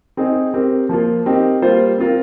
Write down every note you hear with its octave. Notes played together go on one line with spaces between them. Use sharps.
C4 D#4 G#4
C4 G4 A#4
F3 A#3 F4
C4 D#4 G4 A#4
G3 A#3 F4 C5
C4 F4 A#4